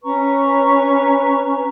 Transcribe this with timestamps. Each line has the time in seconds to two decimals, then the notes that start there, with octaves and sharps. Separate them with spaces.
0.03 C#4 B4 A#5 C#6